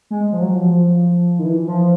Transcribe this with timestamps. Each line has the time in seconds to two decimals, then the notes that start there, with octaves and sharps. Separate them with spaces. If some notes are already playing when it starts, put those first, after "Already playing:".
0.11 G#3
0.33 F3
0.41 F#3
0.56 F3
1.39 D#3
1.45 E3
1.68 F3